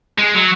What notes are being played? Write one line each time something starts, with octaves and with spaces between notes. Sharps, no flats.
G#3
F#3